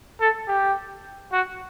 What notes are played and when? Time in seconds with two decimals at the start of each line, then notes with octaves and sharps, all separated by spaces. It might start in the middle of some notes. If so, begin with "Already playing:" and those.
0.21 A4
0.48 G4
1.33 F#4